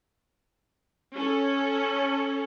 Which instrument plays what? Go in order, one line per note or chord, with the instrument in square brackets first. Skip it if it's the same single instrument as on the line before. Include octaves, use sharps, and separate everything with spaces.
[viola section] C#4 A4